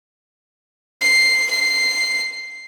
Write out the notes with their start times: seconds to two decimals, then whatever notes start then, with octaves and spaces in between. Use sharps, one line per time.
1.01 C7
1.50 C7